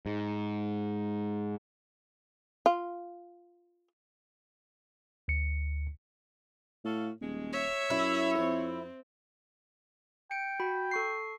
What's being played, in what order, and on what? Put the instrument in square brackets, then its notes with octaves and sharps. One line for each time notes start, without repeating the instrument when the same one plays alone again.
[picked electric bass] G#2
[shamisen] F4
[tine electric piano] D2 C#7
[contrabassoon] A2 [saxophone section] F#4 A4 F5
[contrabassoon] D#1 [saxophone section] B2 G#3
[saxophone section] C#5 [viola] E5
[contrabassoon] F#2 [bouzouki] E4
[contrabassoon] F2 [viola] C4
[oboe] G5 [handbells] C#7 D7
[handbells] F#4 B5
A4 C#6 C7